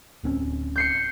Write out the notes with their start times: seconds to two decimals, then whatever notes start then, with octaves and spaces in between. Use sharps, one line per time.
0.24 D1 C4 C#4
0.76 G6 C7 C#7